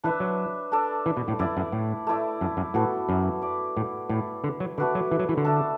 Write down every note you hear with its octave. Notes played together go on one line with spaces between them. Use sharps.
E3 D4 B4 E5
F#3
D4 A4 D5
E3
B2
A2
F#2 E4 D5
F#2
A2
A3 E4 D5
F#2
F#2
A2 B3 F#4 A4
F#2
E4 D5
A2
A2 E4 D5
D3
F#3
D3 A3 F#4 B4 D5
F#3
E3
F#3
E3
D3
A3 D4 A4